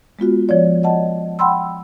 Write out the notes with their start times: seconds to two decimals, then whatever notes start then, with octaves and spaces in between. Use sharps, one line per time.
0.19 G#3 B3 F4 F#4
0.49 F3 C#5 D5
0.83 D#5 F#5 A5
1.39 F#5 G5 B5 C6 E6